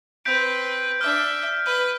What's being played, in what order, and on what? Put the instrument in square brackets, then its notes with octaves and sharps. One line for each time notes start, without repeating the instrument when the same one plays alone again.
[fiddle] C4 B4 [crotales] G6 B6 D7
[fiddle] D4 E5 [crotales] F6
[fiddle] B4